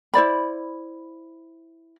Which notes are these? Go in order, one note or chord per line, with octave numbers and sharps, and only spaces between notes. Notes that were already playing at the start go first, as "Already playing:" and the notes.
E4 C5 D5 B5